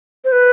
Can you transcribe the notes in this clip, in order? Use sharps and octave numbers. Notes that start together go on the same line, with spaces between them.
C5
B4